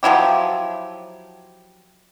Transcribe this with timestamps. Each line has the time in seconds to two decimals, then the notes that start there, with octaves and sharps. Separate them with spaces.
0.03 F3 F#3 E4 G4